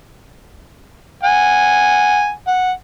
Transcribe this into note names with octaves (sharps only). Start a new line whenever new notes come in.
F#5 G#5
F#5